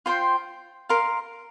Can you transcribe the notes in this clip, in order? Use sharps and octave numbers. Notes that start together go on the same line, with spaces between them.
F4 C5 G5 C6
A#4 F5 C6